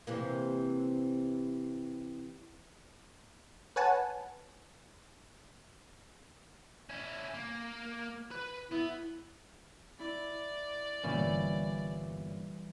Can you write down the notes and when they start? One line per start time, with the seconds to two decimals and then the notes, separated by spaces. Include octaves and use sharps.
0.07 C3 E3 A#3
3.76 B4 C#5 F#5 G#5 A5
6.90 C#4 E4
7.34 A#3
8.31 B4 B5
8.71 B3 E4
9.99 E4 D5
11.04 G1 A#2 E3 G3 C#4